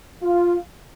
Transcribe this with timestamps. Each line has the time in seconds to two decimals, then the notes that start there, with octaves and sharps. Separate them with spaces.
0.23 F4